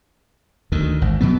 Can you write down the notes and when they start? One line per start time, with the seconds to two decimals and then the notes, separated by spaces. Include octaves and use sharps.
0.72 D2 D#3
1.02 G#1
1.21 B2 F#3 B3